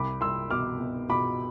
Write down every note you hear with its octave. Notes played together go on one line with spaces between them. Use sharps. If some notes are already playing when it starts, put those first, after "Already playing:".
Already playing: C2 B5 D6
C2 C6 E6
B2 D6 F6
B2
B2 B5 D6